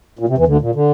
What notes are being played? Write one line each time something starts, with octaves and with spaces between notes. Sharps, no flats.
A#2
C3
E2 E3
D2 D3
A#2
D3